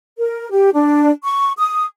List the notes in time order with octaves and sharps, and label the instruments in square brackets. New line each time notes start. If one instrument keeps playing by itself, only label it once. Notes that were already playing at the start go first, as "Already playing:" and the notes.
[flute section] A#4
G4
D4
C#6
D#6